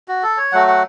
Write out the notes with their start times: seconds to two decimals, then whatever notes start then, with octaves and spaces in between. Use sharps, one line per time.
0.08 F#4
0.23 A4
0.37 C#5
0.52 F#3 A3 F#4 F#5
0.67 F#5